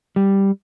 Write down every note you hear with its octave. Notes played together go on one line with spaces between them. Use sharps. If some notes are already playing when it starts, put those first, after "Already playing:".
G3